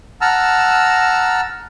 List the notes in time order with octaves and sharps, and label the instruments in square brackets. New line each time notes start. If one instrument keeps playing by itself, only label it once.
[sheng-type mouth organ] F#5 A5 A#5 E6 F6